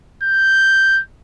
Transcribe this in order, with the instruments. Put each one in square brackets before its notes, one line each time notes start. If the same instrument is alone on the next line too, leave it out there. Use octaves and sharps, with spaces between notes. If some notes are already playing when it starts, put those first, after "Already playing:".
[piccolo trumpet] G6